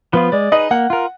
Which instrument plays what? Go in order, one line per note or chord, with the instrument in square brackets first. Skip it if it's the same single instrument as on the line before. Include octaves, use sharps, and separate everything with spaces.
[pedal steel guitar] F3 B3 F4 [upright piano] B4
[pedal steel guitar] G#3 [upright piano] D5
[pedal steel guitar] D#4 G#4 B4 [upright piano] D#5
[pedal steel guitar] A#3 [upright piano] F#5
[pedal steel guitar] F4 A#4